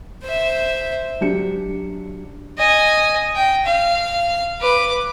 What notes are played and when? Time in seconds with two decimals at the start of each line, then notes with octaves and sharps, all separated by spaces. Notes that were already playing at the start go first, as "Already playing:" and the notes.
0.23 C5 E5
1.21 F#3 D4 G4 C#7
2.58 D#5 G#5
3.35 G5
3.65 F5
4.61 B4 D6